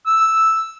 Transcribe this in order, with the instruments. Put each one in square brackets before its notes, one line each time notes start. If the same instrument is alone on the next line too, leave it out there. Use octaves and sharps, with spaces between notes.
[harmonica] E6